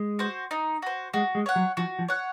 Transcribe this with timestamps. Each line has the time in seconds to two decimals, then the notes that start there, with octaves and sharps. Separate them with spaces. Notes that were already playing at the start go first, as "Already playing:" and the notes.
Already playing: G#3
0.19 F#4 C5
0.51 D#4
0.82 F#4 C5
1.14 G#3 F#4
1.35 G#3
1.46 C#5 F#5
1.56 F#3
1.77 F3 F#4
1.99 F3
2.08 C#5 F#5